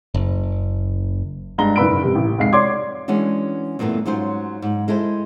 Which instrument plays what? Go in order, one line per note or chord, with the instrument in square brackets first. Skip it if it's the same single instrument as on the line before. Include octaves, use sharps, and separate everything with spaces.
[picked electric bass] F#1
[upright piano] G2 G#3 A#5 G7
F#1 G#2 B4 B5 E6 D7
C3 G3
A1
F1 G#3 F5 C7
C#5 D5 C6 D6 G#6
[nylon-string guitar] E3 G#3 C#4 D4 F#4
G2 A#2 E3 A3 B3
G#2 F#3 C#4 F4 C5
G#2
G#3 E4 A4 C5